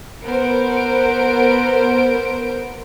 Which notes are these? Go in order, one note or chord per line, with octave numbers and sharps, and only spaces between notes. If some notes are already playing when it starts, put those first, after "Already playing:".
B3 A#4 C5 D7